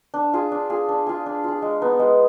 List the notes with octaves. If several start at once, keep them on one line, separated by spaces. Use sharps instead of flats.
D4
F4 G#4
D4
F4 G#4
D4
F4 G#4
D4
F4 G#4
G#3
B3 D#4
G#3